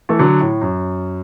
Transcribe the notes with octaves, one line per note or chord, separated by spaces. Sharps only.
E3 A3
D3 F#3
A2
F#2